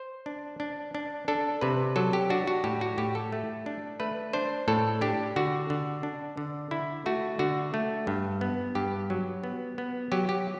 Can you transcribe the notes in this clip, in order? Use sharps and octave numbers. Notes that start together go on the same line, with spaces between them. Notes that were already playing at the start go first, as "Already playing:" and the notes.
Already playing: C5
D4
D4
D4
D4 A4
C3 B4
F#3 A4
G4
D4 F#4
F#4
A2 G4
F#4
A2 G4
A4
A3
D4
A3 B4
D4 C5
A2 A4
D4 G4
D3 F#4
D3
D4
D3
D3 E4
A3 F#4
D3 F#4
A3
G2
B3
G2 G4
F#3
B3
B3
F#3 G4
G4